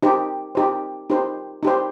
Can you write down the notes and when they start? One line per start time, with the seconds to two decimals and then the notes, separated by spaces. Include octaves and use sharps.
0.03 D#4 G4 C5
0.55 D#4 G4 C5
1.10 D#4 G4 C5
1.63 D#4 G4 C5